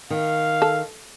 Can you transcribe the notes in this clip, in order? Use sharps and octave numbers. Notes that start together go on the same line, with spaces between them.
D#3 F5
A4